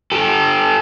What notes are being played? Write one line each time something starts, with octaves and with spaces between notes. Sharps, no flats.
G4 A4